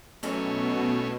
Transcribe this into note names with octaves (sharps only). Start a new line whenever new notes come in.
F#2 B2 E3 F#3 A3 C#4